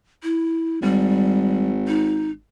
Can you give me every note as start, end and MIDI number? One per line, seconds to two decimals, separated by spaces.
0.23 0.79 64
0.82 2.39 32
0.82 1.67 55
1.88 2.30 63